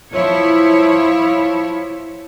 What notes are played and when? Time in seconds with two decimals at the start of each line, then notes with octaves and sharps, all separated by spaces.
0.12 F3 E4 C#5